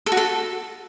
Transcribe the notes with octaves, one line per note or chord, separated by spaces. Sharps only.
A4
F#4
A4